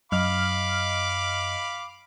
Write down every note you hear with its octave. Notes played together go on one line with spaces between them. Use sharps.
F#2 D#5 F5 B5 D6 F6